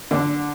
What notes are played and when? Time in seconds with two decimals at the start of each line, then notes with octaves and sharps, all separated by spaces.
0.11 D3